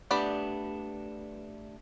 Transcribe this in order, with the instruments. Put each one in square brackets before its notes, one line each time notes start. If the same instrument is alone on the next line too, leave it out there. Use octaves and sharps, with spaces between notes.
[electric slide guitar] A3 D4 G4 [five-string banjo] B3 D5 B5